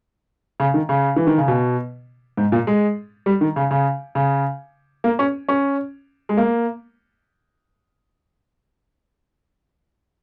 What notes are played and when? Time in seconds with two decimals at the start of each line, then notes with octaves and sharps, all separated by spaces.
0.60 C#3
0.74 D#3
0.89 C#3
1.16 E3
1.27 D#3
1.38 C#3
1.48 B2
2.37 G#2
2.52 A#2
2.67 G#3
3.26 G3
3.41 D#3
3.56 C#3
3.71 C#3
4.15 C#3
5.04 A#3
5.19 C#4
5.48 C#4
6.29 G#3
6.37 A#3